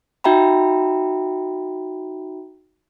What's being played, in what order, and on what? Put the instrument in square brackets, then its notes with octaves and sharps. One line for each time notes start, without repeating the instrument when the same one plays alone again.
[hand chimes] D#4 F#4 E5 G5 A#5 B5